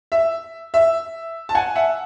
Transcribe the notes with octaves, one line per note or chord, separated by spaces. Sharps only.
E5
E5
A5
F#5 G#5
E5 F#5